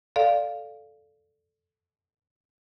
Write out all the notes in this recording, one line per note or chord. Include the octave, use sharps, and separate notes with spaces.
A4 D5 F5